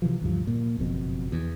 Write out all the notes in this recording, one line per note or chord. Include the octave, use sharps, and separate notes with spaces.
C3 E3 F3
D2 G2 F3
A#2
F#1 F2 B2
E2